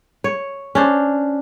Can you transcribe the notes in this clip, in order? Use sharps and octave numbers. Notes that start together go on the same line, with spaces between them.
C#5
C#4 D4 C5